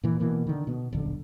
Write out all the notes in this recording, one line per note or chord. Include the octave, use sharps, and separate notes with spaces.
A#2 E3
B2 E3 A#3
D3 D#3
B2 B3
D#1 B1 D3